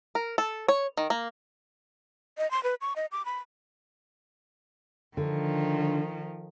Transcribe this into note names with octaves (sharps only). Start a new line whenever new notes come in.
A#4
A4
C#5
D#3
A#3
D#5
C6
B4
C#6
D#5
D6
B5
D3 D#3 F3